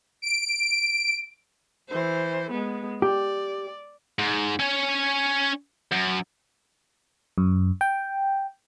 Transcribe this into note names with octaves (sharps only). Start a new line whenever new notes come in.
D7
E3 C5
G#3 B3
G4 D5
G#2
C#4 C#5
F#2
F#2
G5